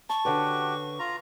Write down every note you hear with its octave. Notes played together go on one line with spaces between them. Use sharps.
A5 C#6
D3 C#4 F#4 G4 B4
F4 A#5